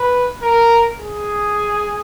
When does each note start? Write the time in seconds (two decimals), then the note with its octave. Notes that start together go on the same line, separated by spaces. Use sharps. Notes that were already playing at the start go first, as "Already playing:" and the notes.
Already playing: B4
0.43 A#4
0.99 G#4